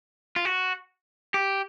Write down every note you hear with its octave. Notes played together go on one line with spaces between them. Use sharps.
F4
F#4
G4